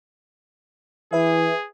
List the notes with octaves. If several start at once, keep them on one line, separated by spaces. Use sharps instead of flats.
E3 G#4 B4 E5